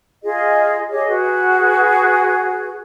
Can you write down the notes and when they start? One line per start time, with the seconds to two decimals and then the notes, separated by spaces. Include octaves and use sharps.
0.23 F4 G#4 D#5
0.90 G4 G#4 C#5 D#5
1.07 F#4 G#4 B4